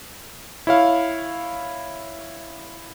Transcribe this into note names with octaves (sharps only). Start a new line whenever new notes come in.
E4 C#5 F5